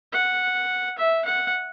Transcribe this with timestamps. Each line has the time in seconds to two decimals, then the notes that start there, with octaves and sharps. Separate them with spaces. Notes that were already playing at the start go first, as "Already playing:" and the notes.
0.13 F#5
0.98 E5
1.25 F#5